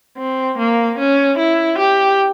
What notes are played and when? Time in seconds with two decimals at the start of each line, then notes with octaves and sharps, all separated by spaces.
0.17 C4
0.58 A#3
0.98 C#4
1.38 E4
1.78 G4